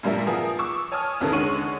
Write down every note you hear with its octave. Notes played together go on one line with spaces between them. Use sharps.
G2 A#2 G3 A#4 E5
F3 B3 G#4 A#4 D#6
C#6 D6 E6
C#5 G#5 A5 D#6 F6
F1 D#2 C#3 E3 A4 A#4
D3 G#3 C#5 C#6 D#7 F#7